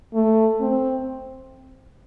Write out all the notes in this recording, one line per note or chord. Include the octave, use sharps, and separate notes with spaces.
A3
C4